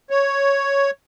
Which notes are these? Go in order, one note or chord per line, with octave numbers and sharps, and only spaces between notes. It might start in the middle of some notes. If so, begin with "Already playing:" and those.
C#5